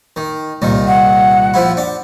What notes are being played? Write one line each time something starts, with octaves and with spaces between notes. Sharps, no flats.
D#3
C2 A#2 D#3
F#5
F3 E4
D4